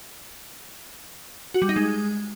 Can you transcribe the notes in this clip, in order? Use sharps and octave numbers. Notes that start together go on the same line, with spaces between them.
F#4
G3
D#4
G#3